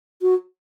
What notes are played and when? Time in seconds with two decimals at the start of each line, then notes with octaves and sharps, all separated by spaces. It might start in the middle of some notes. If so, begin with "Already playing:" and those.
0.22 F#4